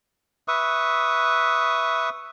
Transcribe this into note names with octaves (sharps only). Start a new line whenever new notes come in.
B4 E5 C#6 D#6